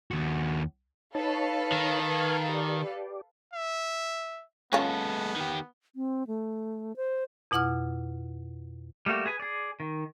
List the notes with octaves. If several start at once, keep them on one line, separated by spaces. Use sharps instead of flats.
D#2 F#4
D#4 A4 B4 C#5 F5 A5
D#3
C#6 F6 G#6
G4 D5
E5
G#3 B3 C#4 F4 A4
D#3 G4
C4
A3
C5
F2 B2 E4 F#5 D6 F6
G3 A3 A#3 F#4 G4
G#4 B4 G#5
G#4 D5
D#3